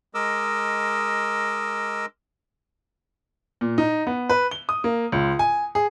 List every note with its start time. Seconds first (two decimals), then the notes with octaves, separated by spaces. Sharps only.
0.14 G#3 A#4 D#5 D6 E6
3.61 A#2
3.78 D#4
4.07 B3
4.29 B4
4.51 G7
4.69 D#6
4.84 A#3
5.12 C#2
5.39 G#5
5.75 G#4